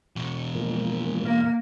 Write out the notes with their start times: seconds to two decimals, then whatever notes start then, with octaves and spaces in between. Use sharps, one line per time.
0.16 E2 B2 C#6
0.55 G#2 F3 A#3
1.25 A#3 F5